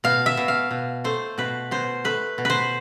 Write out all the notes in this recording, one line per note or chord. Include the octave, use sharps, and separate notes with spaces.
B2 F5
E5
B2
F5
B2
A3 C5
B2 B4
B2 C5
A3 B4
B2
B4 C5